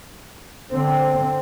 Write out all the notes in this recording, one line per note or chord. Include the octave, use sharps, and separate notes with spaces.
D3 C4